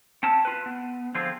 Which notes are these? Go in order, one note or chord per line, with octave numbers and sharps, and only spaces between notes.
C4 C#4 A5
F4 B4
B3
D3 F3 C4 F4 G#4